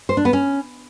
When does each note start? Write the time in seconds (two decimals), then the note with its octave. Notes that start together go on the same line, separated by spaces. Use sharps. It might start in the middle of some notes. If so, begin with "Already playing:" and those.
0.09 C5
0.17 D4
0.25 B3
0.33 C#4